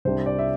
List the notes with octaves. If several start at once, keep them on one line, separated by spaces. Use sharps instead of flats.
C2 C3 G3 D4 C5
D5
E5